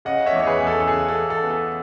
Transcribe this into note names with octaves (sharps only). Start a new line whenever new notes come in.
C#3 D#5 F#5
C#5 E5
E2
C#5
G#4 B4
E2 G#4
A4
A4
C#3 G#4
A4
E2
A4
B3
A4